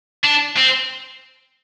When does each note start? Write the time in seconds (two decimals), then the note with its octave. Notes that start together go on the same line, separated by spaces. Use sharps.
0.24 D4
0.57 C4